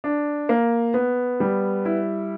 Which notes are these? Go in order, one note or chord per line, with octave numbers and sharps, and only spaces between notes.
D4
A#3
B3
G3
E4